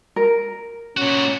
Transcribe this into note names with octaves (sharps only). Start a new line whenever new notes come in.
A#4
A#2 C#4 F#4